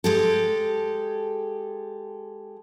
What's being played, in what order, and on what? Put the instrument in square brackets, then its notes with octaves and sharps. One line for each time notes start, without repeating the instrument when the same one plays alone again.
[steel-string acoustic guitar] G#3 G4 A4